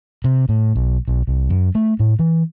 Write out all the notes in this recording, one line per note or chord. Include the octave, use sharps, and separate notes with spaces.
C3
A2
B1
B1
C2
F#2
A3
A2
E3